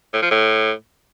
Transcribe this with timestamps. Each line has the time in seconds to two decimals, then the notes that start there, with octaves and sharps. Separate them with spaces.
0.13 A2
0.22 F3
0.31 A2